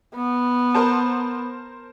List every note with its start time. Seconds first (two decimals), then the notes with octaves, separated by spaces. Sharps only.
0.15 B3
0.75 A#4 C5 A5